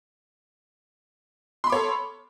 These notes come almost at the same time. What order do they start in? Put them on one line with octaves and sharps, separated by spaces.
C6 B5 D6 C#5 A4